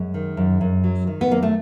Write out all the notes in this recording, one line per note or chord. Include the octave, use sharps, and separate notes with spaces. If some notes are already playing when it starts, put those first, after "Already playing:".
Already playing: F#2 G#3
D#3
F#2
F#2
F#3
D#3
B3
F#2 A#3
A3